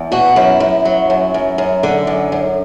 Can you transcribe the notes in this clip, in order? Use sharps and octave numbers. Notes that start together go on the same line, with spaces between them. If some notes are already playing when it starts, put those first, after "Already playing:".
Already playing: E2
B2 F#4
F#2 E4
F#2
F#3
F#2
F#2
F#2
D3
F#2
F#2